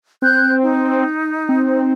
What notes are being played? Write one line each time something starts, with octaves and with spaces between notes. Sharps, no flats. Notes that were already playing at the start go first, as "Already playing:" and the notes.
C4 F#6 G6
D#4
C4